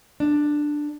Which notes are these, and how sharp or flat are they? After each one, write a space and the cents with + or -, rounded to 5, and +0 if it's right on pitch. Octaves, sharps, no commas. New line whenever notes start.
D4 +10